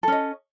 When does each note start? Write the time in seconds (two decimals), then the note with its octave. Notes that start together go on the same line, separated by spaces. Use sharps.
0.03 A4
0.08 C#4
0.12 D#5